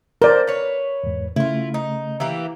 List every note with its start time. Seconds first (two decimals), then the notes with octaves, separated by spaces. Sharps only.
0.22 A#4 C5 D5
0.47 B4 C#5
1.04 E2 G#2
1.36 C#3 A3 E4 F4
1.74 D#4
2.20 E3 A#3 G4